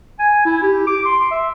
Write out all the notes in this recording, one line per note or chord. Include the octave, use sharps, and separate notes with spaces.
G#5
E4
G4
D6
C6
E5